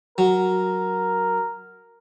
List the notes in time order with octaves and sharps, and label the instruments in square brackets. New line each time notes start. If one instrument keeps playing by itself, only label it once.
[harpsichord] F#3 [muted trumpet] A#4